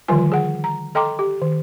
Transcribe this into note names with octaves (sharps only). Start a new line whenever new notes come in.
D3 D#3 F3 G3 F4 G#5
G#4 F#5
A#5
A4 D#5 G5 A#5 C6 D6
G4
D#3